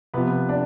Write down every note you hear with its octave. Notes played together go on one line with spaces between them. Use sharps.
C3 F3 B3 B4
D4